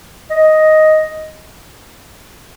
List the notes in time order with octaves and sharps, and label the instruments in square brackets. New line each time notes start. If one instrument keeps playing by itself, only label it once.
[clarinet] D#5